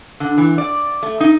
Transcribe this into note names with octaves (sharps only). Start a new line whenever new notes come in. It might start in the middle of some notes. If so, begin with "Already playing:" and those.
D3
E3
D5
A3
D#4